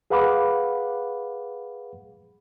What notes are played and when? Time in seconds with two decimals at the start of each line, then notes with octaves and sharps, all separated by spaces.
0.10 G#4 B4 F5 F#5 B5 D6